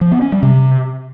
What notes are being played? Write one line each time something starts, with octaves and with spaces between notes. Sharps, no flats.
F3
B3
C#4
G3
C3